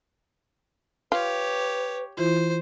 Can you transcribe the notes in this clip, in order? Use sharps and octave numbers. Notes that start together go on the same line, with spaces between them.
F4 G4 B4 C#5
E3 E4 F4 C5